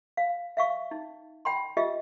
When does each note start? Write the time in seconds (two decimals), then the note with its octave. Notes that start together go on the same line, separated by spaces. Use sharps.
0.17 F5
0.57 E5 F5 C#6
0.91 D#4
1.45 G5 B5 C6
1.77 F4 G4 D#5 E5